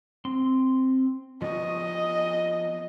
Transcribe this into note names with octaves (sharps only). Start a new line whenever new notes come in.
C4 C6
F3 B3 D#5 C#6